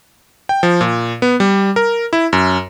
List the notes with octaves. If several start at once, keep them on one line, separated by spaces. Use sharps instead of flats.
G5
F3
A#2
B3
G3
A#4
E4
F#2